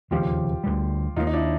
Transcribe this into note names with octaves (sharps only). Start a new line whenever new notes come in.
E1 D#2 C#3 F3 F4 G4
D2 D3 G3
D#2 D#3 G3 A#3 D#4 F4
D#4
D4 E4